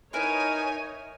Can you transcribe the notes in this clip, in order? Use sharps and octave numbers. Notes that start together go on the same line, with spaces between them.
D#4 E4 A#4 B4 C#5 G#5